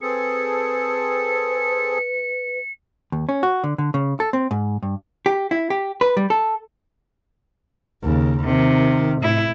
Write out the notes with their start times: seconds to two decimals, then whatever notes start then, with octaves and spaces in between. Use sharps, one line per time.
0.01 C4 G#4 A4 B4 C#7
3.12 D#2
3.29 C#4
3.43 F#4
3.64 D3
3.78 D3
3.94 C#3
4.20 A4
4.33 C4
4.51 G#2
4.83 G2
5.26 G4
5.51 E4
5.70 G4
6.01 B4
6.17 G3
6.30 A4
8.03 D#2 C#3
8.45 C3 D#3
9.23 A2 E4